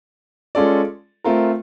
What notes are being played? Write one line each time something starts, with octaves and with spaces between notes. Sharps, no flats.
G#3 C#4 F4 A4 D5
A3 C4 F4 A#4